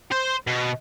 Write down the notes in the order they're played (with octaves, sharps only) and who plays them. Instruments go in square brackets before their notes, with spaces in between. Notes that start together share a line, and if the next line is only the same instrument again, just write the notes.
[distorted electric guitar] C5
B2